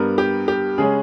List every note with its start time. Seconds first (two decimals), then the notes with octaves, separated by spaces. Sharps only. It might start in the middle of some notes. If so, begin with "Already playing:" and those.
Already playing: G2 G3 B3 A#4
0.18 G4
0.48 G4
0.78 C#3 G#3 C#4 G#4